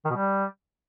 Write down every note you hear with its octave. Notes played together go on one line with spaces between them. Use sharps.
D#3
B2
G3